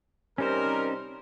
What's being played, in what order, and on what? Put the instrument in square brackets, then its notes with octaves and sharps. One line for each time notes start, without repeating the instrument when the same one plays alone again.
[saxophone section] C3 G3 C4 [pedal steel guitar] C#4 D#4 C5 [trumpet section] A#4